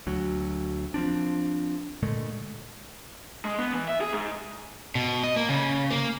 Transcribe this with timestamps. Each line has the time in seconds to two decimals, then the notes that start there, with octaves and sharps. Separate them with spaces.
0.07 D2 F#3
0.94 F3 C4 D4
2.03 A#2 D3 G#3 A3
3.45 G#3
3.59 B3
3.73 E3
3.88 E5
4.01 G#4
4.13 G#2
4.95 B2
5.23 D#5
5.36 A#3
5.49 C#3
5.91 A#3